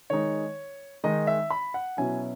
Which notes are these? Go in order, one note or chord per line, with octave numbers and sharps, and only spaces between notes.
D#3 G#3 D#4 C#5
D#3 G#3 D#4 D#5
E5
B5
F#5
B2 F#3 C#4 E4 G#5